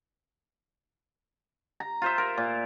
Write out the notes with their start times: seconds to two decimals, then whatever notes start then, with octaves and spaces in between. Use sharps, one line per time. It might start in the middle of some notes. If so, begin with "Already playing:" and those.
1.80 A#5
2.02 F4 C5 E5
2.18 A#4
2.38 A#2